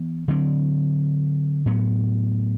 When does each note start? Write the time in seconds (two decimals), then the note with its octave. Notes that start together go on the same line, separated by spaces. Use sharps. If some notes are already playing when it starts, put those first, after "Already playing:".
Already playing: E3 B3
0.28 D3 F#3 C4
1.66 A2 F#3 B3